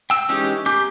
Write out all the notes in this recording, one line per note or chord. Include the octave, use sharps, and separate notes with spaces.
G5 E6
E3 G#3 C#4 D#4 G4
A#3 G4 G#5 D6 G6